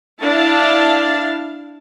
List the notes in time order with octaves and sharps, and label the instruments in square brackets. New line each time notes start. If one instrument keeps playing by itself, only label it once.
[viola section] D4 E4 F5 A5